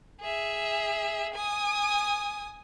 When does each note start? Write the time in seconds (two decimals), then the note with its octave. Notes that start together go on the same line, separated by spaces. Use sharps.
0.21 G#4 E5
1.34 G#5 D#6